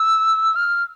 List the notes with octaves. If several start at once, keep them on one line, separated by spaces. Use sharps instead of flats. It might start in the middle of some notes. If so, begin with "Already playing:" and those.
Already playing: E6
F6